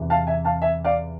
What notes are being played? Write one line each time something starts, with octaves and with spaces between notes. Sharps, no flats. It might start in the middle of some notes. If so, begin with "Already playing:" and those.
Already playing: E2 C3 E3
F5 A5
E5 G#5
F5 A5
E5 G#5
D5 F5